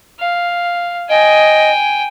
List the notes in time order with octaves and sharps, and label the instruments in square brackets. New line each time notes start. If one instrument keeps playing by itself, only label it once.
[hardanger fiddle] F5
[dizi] D#5 [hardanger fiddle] G5 G#5